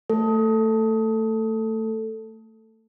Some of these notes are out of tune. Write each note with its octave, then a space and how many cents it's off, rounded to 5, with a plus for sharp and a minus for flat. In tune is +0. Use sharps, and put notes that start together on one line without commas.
A3 +20 A4 +5